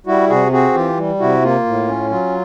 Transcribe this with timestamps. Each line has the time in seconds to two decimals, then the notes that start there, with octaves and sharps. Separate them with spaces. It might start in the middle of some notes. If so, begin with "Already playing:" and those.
0.06 G3 E4 F#4
0.29 C3 F#4 G#4
0.52 C4 F#4 G#4
0.74 E3 F4 G4
0.97 G3
1.20 C3 E4 F#4
1.42 A#3 F4
1.65 A2
1.88 C#4
2.10 F#3 F4